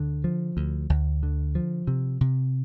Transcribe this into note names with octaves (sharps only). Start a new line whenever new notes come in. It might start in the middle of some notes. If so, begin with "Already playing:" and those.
Already playing: D2 D3
F3
D2
D2
D3
F3
C3
C3